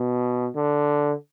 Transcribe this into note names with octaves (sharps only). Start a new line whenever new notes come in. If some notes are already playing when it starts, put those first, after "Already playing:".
Already playing: B2
D3